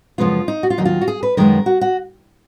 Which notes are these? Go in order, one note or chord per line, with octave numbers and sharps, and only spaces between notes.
F#2 C#3 F3 G#3 B3 F4
D#4
F#4
F4
D#2 D#3 F#3 D#4
F4
F#4
G#4
B4
F#2 D#3 G#3 B3 A#4
F#4
F#4